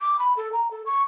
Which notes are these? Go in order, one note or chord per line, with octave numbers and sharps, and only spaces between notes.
D6
B5
A4
A#5
A4
C#6